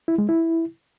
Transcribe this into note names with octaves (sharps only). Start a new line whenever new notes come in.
E4
G#3
E4